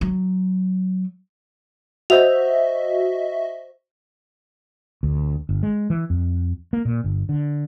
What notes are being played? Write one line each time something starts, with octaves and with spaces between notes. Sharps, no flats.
F#3
F#4 C5 D#5 E5 F7
D2
G1
G#3
E3
F2
A#3
A#2
G1
D3